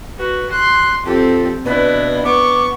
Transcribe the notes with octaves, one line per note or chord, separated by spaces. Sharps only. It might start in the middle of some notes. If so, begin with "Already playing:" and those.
F#4 B4
C6 F#6
F2 C4 G4 A4
B2 D4 E4 B4
B3 C#6 D6